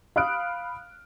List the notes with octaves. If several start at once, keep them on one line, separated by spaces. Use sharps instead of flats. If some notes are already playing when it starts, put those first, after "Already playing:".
F5 B5 D#6 F6 F#6 D7